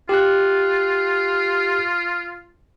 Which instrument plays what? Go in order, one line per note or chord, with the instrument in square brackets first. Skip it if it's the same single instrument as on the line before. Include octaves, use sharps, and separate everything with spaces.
[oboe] F4 [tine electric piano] G4 F#6